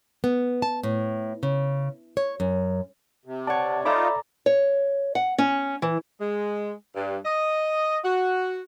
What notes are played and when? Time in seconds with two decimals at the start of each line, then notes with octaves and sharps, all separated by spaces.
0.24 B3
0.62 A5
0.83 A2
1.43 C#3
2.17 C#5
2.40 F#2
3.25 C3
3.47 C#5 D5 F#5 A5
3.85 D#4 F4 A4 D5 E5 A#5 B5 D6
4.46 C#5
5.15 F#5
5.38 C#4
5.82 E3
6.20 G#3
6.96 G2
7.25 D#5
8.03 F#4